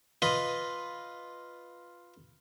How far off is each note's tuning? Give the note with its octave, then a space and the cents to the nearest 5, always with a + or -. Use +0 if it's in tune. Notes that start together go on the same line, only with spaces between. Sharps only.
F4 +0 B4 +0 D#5 +0